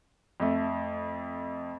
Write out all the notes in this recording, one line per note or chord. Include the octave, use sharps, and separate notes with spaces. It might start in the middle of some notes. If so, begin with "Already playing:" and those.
F2 A3